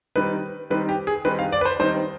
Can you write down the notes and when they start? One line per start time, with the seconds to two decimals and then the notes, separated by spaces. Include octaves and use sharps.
0.16 D#3 G3 C4 D#4 B4
0.70 D#3 G3 C4 D#4 B4
0.89 G4
1.07 G#4
1.25 D#3 G3 C4 D#4 B4
1.39 F5
1.52 D5
1.61 B4
1.65 C5
1.79 D#3 G3 C4 D#4 C5